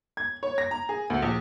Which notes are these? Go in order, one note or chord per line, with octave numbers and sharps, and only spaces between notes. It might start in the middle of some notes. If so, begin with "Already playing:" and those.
G#6
C#5
A#6
A#5
G#4
D2
A#1